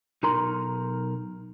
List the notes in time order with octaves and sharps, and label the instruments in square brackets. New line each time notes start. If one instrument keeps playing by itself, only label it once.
[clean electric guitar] B1 D#4 A#4 A#5 C6